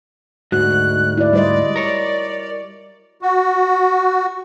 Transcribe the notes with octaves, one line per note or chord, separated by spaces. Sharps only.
D2 G#2 F#4 F#6
E4 D5
G3 C5 D5 D#5
A#4 C#5
F#4